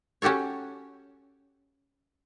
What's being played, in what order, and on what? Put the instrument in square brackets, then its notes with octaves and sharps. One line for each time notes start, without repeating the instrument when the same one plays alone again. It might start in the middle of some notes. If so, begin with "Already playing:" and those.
[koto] C#4 F#4 G4 A4 C#5